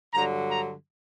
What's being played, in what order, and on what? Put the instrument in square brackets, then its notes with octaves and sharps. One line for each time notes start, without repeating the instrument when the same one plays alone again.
[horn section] G2 D3 F#3 A#5
A#5